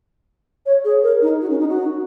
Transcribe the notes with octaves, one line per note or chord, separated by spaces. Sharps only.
C#5
G#4
A#4
D#4
F#4
C#4
D#4
F#4